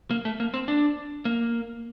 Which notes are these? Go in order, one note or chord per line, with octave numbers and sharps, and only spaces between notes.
A#3
A3
A#3
C4
D4
A#3